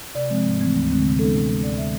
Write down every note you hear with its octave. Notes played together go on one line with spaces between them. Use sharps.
C3 D5
F3 G#3 C4
G#2
E3 A3 C4
D2
D3 G#3 C4
C3
E3 G#3 B3 D4 A4
C3
E3 G#3
D2 D5
D3 G#3 E5